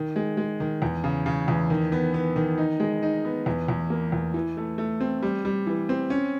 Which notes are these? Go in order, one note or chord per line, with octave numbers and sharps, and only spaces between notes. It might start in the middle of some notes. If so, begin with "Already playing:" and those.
Already playing: D#3
G#3
G#3
D#3
E2
C#3
C#3
E2
D#3
B3
B3
D#3
D#4
G#3
D#4
B3
E2
E2
A#3
E2
E3
A3
A3
C4
G3
G3
E3
C4
C#4